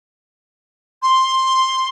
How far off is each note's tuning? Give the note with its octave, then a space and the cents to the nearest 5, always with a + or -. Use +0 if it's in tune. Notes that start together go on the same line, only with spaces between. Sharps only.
C6 +5